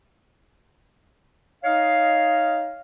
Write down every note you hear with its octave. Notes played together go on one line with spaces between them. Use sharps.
D#4 C#5 D#5 F5